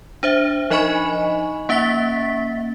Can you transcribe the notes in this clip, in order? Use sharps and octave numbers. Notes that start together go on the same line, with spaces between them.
D4 C5 E5
F3 D#4 D#5 G#5 B5 C#6
A#3 C#4 E5 A6 B6